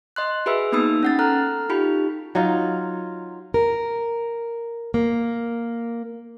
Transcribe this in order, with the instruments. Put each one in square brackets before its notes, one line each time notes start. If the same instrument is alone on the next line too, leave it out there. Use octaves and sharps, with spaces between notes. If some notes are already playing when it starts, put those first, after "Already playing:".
[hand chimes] D#5 C6 F#6
F#4 G#4 B4 E5 B5 E6
A#3 B3 D#4 B5 D#6 E6
C#4 F#5 A6
A4 A#5 F6 F#6
D#4 F4 G4 B5
[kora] F#3 D#4 F4
[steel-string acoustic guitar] A#4
A#3